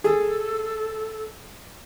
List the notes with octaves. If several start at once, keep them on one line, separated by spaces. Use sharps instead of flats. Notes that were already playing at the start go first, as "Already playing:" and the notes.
G#4 A4